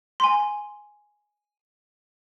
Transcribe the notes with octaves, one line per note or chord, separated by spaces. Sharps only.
G#5 C6